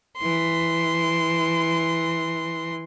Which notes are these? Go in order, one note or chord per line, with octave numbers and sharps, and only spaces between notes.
E3 C6